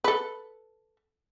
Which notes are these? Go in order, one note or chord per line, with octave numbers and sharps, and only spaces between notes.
A4 B4